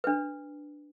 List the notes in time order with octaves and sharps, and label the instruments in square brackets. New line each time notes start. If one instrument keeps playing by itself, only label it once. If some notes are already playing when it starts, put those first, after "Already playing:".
[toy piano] D4 B4